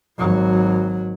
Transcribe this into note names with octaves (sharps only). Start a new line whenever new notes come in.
G#1 F#3